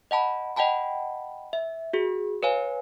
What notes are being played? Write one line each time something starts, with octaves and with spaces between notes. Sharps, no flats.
D#5 F#5 A5 B5
D#5 F#5 G5 A5 B5
E5
F#4 G#4
B4 C#5 F5 G#5